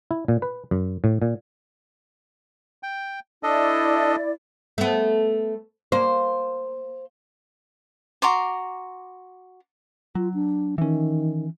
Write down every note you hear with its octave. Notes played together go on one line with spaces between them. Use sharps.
E4
A#2
B4
F#2
A2
A#2
G5
D4 E4 A4 D5 D#5
A3 B3
A#3 C5
F#4 A#5 C6 D6
F#3 F4
D4
D#3 E3 C#4